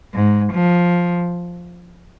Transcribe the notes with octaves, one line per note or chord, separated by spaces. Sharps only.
G#2
F3